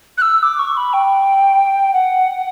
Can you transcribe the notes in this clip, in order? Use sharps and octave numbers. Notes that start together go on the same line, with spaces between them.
F#6
E6
D6
C#6
B5
G5
F#5